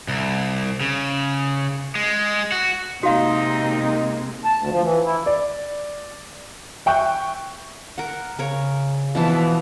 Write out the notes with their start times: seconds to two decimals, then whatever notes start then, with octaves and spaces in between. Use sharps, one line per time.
0.08 C2
0.81 C#3
1.95 G#3
2.52 F#4
3.03 C3 G#3 A#3 D#4 F#4 F5
4.45 A5
4.58 D2
4.70 F3
4.82 E3
5.05 E4
5.26 D5
6.86 E5 G5 C#6 F#6 G6
7.98 A#4 F#5
8.39 C#3 A#4 C#5
9.15 B2 E3 F3 A5